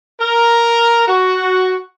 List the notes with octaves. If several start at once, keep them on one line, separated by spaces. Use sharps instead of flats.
A#4
F#4